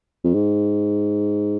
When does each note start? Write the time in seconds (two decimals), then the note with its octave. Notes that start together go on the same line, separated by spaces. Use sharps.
0.24 F2
0.34 G#2